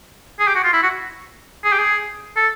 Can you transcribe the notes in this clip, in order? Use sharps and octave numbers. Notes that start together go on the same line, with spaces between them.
G#4
G4
F#4
F4
E4
F#4
G#4
G4
G#4
A4